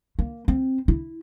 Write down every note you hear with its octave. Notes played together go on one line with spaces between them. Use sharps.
A#3
C4
E4